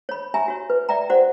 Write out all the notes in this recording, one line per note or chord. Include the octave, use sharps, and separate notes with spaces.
C#5 B5
G4 E5 G#5 A#5
F#4 C#5
B4
D5 E5 G5 A#5
F#4 C5 D5 F#5